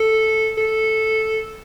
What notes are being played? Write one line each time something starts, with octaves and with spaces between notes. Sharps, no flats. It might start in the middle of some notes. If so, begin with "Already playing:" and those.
Already playing: A4
A4